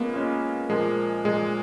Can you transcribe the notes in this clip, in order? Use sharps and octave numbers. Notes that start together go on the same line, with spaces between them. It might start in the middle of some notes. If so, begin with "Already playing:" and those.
Already playing: G#3 A#3 B3 C#4 F4
G#3 C#4 F4
A#2 F3 G#3 A#3
A#2 F3 G#3 A#3